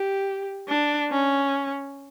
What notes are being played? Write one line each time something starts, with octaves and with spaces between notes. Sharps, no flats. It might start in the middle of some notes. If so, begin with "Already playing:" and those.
Already playing: G4
D4
C#4